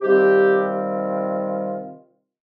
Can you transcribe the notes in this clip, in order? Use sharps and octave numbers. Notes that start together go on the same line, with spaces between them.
C3 D#3 G3 C4 F4 G4